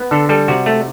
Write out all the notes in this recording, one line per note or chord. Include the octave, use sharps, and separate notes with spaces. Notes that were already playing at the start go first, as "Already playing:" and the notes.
Already playing: B3
D3 A4
G3 A4
C3 F#4
A3